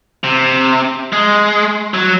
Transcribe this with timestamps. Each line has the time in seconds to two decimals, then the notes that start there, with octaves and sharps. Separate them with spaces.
0.24 C3
1.13 G#3
1.94 F#3